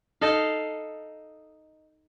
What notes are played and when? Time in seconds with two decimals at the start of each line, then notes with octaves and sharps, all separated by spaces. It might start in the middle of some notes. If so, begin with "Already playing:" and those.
0.21 D#4 A4 D#5 F5